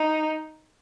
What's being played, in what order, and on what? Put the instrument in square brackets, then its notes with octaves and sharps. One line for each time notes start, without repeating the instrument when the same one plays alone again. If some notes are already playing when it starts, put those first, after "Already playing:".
Already playing: [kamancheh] D#4